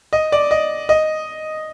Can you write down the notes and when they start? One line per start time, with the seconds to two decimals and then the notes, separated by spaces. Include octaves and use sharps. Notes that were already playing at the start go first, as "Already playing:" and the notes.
0.13 D#5
0.32 D5
0.51 D#5
0.89 D#5